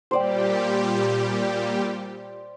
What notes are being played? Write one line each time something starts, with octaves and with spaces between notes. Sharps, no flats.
A#2 G3 G4 C5 D5 G5